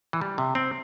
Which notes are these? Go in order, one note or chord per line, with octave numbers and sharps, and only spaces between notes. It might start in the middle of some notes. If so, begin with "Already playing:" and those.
E3
G3
C3
C4